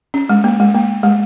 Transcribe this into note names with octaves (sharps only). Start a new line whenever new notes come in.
C#4
G#3
A#3
G#3
A#3
G#3